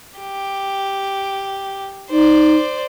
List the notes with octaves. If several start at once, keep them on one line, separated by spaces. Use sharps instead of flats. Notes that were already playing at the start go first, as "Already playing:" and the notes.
G4
D#4 C5 D5